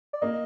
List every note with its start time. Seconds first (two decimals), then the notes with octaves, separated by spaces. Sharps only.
0.13 D5
0.22 A#3 D#5